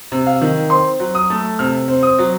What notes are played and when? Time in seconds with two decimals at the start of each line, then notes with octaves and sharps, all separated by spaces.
0.12 C3
0.27 F5
0.41 D#3
0.70 C4 C6
1.00 F#3
1.15 D#6
1.30 A3
1.59 C3 F6
1.88 C4
2.03 D#6
2.18 F#3